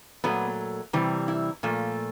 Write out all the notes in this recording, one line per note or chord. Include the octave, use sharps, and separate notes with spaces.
A#2 F#3 A3 B3
C3 E3 G3
E4
A#2 F3 A3